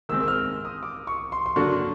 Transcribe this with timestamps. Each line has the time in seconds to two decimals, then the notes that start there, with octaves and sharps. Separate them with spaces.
0.09 D#3 G#3 C4 E6
0.20 E6
0.28 F6
0.65 D#6
0.83 D6
1.07 C#6
1.32 C6
1.46 C6
1.56 D3 F#3 A#3 D4 F#4 C#6